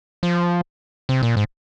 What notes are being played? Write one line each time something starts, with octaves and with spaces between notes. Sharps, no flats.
F3
C3
A#2
G#2